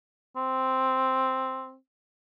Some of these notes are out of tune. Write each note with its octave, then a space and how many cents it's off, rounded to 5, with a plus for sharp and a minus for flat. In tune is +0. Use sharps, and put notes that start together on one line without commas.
C4 +0